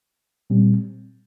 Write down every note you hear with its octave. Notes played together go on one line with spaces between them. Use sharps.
A#2 G3 C4